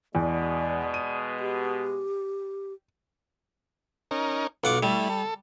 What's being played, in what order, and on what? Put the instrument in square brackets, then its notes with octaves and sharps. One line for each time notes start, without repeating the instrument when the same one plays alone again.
[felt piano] E2 [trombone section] B2 G#3 [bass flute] D5
[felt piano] D#7
[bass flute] G4
[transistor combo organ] C#4 D#4 A#4
[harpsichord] B1 F#5 D6 [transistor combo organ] F4
[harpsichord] G3 [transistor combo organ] A3 E4
[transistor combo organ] A4